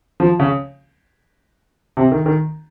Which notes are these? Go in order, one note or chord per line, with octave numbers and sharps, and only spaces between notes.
F3
C#3
C3
D#3
D#3